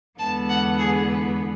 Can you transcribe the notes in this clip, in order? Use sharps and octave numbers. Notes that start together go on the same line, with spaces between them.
E2 D3 G#3 B3 A5
F#5
G#4